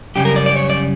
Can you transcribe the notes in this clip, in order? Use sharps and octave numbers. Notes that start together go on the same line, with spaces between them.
F#2 C#3 G3 C#4 G4
A#4
D5
D5
C#5
D5